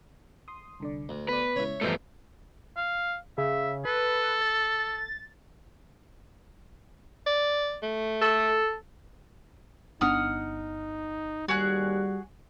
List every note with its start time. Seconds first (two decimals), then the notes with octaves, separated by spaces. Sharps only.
0.48 C6 D#6
0.80 C2 D3 D5
1.09 D2 A3
1.29 B3 B4 D5
1.56 C#3 G#3 E4 C#5 E5
1.81 G2 B2 E3 F3 A3 F4 D5
2.77 F5
3.38 C#3 E5
3.85 A4 B4
4.41 A6
7.27 D5
7.83 A3
8.22 A4
10.01 G1 B3 D4 D#4 F#5 D#6 F6
11.48 D#2 G3 F#4 G#4 F#6